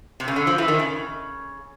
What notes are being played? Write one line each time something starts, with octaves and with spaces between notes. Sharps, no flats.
C3
C#3
D3
F3
E3
D#3
C#3